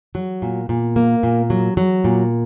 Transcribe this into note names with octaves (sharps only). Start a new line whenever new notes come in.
F#3
A#2
A#2
A#3
A#2
F#3
F#3
A#2